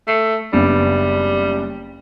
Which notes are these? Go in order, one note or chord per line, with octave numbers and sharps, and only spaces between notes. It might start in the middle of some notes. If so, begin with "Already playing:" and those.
A3 C7
F#1 G3 B3 D4